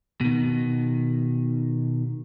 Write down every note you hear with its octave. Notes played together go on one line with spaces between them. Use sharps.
B2 D#3